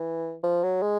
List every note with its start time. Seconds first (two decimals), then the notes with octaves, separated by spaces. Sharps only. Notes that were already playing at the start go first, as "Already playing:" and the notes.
Already playing: E3
0.44 F3
0.63 F#3
0.82 G#3